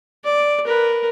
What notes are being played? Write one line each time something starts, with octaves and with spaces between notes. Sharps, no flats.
D5
A#4 B4